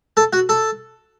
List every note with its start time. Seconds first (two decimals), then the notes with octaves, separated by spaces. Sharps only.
0.17 A4
0.33 F#4
0.49 A4